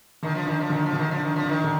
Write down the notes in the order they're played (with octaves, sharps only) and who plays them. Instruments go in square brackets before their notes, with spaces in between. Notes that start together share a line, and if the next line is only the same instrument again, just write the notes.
[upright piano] D3 [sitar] D#3
[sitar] F3
[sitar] D#3 [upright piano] D4
[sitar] F3
[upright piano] D3 [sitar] D#3
[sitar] F3
[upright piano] D3
[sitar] D#3
F3
[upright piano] D4
[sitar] D#3
F3
[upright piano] D4
[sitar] D#3
[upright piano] D3